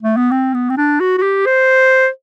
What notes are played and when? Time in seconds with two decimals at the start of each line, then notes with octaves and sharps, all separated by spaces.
0.02 A3
0.17 B3
0.31 C4
0.54 B3
0.70 C4
0.77 D4
1.00 F#4
1.18 F#4
1.22 G4
1.46 C5